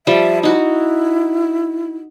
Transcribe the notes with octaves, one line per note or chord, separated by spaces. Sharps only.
F3 G3 E5 A5
D#4 E4 F#4